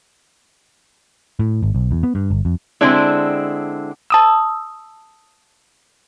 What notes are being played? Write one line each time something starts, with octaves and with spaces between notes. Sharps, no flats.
A2
G#1
B1
E2
B3
G2
G1
F2
D3 G#3 C4 D4 E4
A5 D#6 E6